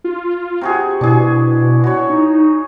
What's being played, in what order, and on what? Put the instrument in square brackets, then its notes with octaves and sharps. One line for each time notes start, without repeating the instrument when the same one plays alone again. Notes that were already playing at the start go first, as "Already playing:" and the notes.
[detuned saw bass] F4
[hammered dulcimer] C3 F#4 G#4
[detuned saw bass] B2 [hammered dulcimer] D4 G#4 [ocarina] E4
[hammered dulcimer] F#4 C#5
[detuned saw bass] D#4